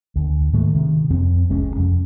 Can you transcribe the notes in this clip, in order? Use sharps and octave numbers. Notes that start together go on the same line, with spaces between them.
D2
G#2 D#3 G#3 A3
C3 D#3
F2 C4
F1 C2 G#3 C#4
F2